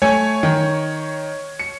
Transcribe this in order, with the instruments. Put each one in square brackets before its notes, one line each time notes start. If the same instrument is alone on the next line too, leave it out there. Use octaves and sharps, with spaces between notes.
[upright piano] A3 G#5 [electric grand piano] C#5
[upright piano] D#3
C#7